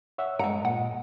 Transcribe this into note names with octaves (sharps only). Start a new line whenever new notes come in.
C#5 E5 F#5
G2 G#3 F#5 A#5
A#2 F#5